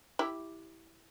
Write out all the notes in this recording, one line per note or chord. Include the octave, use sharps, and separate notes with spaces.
E4 G4